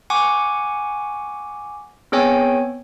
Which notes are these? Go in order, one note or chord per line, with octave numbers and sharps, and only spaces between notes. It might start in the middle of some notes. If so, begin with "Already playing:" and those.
F#5 G#5 C#6 D6
B3 C4 G#4 C#5 G5 G#5